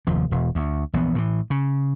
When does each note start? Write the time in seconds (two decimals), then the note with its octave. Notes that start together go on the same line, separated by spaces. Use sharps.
0.07 F1 D#2 F3
0.31 E1
0.55 D2
0.93 A#1 E3 B3
1.15 A2 D#3 E3
1.50 C#3